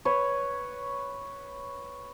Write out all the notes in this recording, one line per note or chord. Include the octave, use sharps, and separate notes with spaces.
B4 C#5